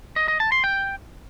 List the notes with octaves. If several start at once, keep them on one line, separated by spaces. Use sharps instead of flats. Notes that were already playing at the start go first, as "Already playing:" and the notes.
D#5
D#5
A5
C6
G5